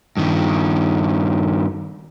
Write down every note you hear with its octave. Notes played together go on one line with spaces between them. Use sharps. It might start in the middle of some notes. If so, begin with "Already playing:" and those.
G2 D#3